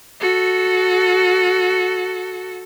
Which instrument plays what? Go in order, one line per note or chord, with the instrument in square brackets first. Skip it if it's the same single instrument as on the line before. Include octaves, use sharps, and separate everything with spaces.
[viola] F#4 A4